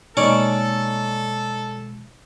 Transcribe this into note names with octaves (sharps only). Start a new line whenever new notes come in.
B2 G#3 A#3 C#4 D#4 A4 C#5 D5